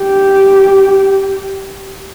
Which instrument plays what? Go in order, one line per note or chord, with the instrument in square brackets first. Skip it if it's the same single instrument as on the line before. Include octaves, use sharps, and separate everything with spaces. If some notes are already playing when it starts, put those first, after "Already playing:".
Already playing: [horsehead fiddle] G4